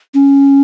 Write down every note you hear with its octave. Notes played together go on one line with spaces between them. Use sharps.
C#4